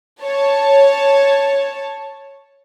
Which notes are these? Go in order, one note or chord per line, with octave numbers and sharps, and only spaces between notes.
C#5 A5